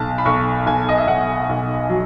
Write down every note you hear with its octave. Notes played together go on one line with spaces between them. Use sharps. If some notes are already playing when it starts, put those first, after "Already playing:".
Already playing: B1 A5
B5
B1 C#6
B1 G#5
D#5
E5
B1 F#5
B1
F#3